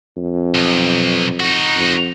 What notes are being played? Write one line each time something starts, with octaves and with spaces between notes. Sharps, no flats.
F2
B1
D#4 F#4
F2